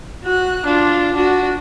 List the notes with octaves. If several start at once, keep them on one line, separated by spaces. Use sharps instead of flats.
F#4 F#6
D4 F4
D4 F#4